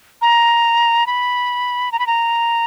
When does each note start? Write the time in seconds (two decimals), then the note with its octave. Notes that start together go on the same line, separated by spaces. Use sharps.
0.22 A#5
1.07 B5
1.92 A#5
1.99 B5
2.07 A#5